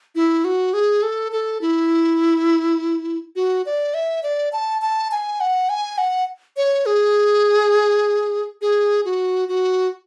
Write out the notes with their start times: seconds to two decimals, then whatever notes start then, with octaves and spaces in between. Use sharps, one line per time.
0.15 E4
0.45 F#4
0.74 G#4
1.03 A4
1.32 A4
1.61 E4
3.36 F#4
3.66 D5
3.94 E5
4.23 D5
4.53 A5
4.82 A5
5.11 G#5
5.40 F#5
5.69 G#5
5.98 F#5
6.57 C#5
6.86 G#4
8.62 G#4
9.05 F#4
9.48 F#4